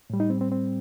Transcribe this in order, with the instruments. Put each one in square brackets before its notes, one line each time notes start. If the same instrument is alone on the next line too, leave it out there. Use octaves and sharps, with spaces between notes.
[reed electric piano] A2 G3
D#4
C4
C4
C4